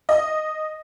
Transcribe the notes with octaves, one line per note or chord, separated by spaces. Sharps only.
D#5